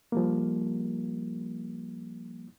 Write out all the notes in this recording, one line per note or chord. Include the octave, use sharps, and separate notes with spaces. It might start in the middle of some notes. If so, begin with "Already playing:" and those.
F3 G3 A#3